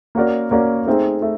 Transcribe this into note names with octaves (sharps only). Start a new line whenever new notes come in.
A#3 C#4 F#4 A#4 D5
A#3 C#4 F#4 A#4 D5
A3 C4 D#4 G#4 C5
A3